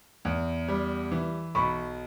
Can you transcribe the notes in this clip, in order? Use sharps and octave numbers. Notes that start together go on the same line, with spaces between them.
E2
G3
E3
B1 B5 C#6